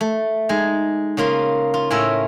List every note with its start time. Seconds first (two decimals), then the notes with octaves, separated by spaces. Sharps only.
0.01 A3
0.49 G#3 D#4
1.17 C#3 A#3 F4
1.74 F4
1.91 A2 C#4 F4 A#4 E5